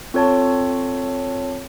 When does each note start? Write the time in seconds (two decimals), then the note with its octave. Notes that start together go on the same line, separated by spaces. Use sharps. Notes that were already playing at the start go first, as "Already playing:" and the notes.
0.14 C4 F4 A4 C#5 A5